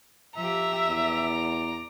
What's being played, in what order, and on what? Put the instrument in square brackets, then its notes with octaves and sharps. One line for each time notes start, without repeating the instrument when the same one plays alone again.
[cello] F3 G4 [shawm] E5 [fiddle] A#5
[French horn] E2 [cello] D5